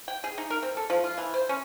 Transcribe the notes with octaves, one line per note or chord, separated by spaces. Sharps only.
G5
G#4
D#4
A#4
C4
A4
F3
F4
E3
C5
C#4